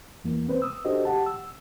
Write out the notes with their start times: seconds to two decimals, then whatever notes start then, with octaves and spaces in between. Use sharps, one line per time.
0.24 E2 E3 A#3
0.48 C4 B4 C5
0.62 D#6 E6
0.85 D4 F#4 G4 A4 C5 D#5
1.05 G4 F#5 A5
1.26 E6